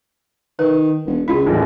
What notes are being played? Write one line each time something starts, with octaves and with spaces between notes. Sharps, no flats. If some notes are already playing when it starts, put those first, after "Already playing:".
D#3 B4
E1
C#2 E4 F4 G#4
A1 D#2 A2 E3